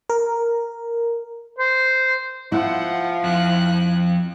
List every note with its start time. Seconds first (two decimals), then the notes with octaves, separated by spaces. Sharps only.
0.10 A#4
1.58 C5
2.52 F3 E4 F#5
3.24 F2 F#6